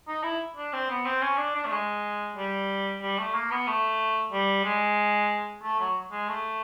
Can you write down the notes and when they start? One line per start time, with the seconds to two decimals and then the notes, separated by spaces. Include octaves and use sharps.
0.08 D#4
0.23 E4
0.56 D4
0.73 C4
0.90 B3
1.06 C4
1.22 C#4
1.38 D4
1.55 D4
1.65 A3
1.71 G#3
2.37 G3
3.02 G3
3.18 A3
3.35 A#3
3.51 B3
3.67 A3
4.32 G3
4.65 G#3
5.62 A3
5.80 F#3
6.11 G#3
6.28 A3